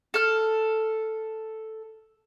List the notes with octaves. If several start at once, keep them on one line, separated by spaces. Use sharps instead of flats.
A4 F6